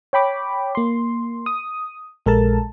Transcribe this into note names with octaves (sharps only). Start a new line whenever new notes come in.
C#5 G5 B5 D6
A#3 C6
D#6
A#1 G#3 A4 A#4 A5